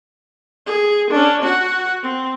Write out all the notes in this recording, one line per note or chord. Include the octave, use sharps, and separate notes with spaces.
G#4
C#4 D4
F#4 F#5
C4